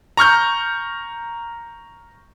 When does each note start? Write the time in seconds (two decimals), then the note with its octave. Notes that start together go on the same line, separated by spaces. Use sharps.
0.17 A#5 C#6 F6 G6